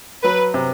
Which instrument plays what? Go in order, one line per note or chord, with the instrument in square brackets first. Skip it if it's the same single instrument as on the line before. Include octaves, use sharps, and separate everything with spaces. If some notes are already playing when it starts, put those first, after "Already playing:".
[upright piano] F#3 [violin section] B4
[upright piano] C3